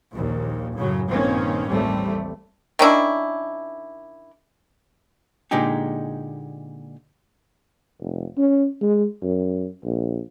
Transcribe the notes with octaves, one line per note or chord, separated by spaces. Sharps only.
A#1 D#2 A#2
F#2 A2 C#3 F#3
A#1 G2 D#3 A#3 C4 C#4
A1 D#2 G3 A3 C4
D#3 C#4 D4 E4
A#2 D3 G#3 D#4 G4 G#4
F1
C#4
G#3
F#2
A#1